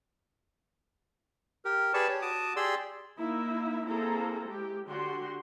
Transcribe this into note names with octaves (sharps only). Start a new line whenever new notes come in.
G4 A#4
G4 G#4 B4 D5 A5 C#6
G4 C#5
F#4 A5 D6 D#6
G4 G#4 D5 C6 E6
A#3 D#4 E4 E5
A#3 C4 E4 G#4 A4 A#5
G#3 G4
D3 F#4 G4 C6